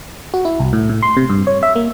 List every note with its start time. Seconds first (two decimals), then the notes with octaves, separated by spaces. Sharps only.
0.34 F#4
0.45 E4
0.60 C2
0.73 A2
0.89 A2
1.02 C6
1.17 C3
1.30 G2
1.47 C#5
1.63 E5
1.76 A#3